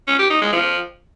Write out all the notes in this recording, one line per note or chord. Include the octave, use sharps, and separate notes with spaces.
C#4
G4
D#4
G#3
F3